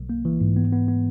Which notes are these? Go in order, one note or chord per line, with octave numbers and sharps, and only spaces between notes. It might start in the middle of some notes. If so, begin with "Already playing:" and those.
Already playing: B1
A#3
E3
G#2
B3
B3
B3